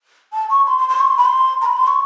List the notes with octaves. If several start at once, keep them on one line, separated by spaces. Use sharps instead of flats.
A5
C#6
C6
C6
C6
C#6
C6
B5
C6
A#5
B5
C6
C#6